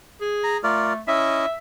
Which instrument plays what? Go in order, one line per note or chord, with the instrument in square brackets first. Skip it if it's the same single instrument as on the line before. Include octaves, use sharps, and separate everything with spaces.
[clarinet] G#4
[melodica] A#5
[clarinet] A3 [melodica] F4 A#4 D5
[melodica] C#4 E4 D#5 [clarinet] E5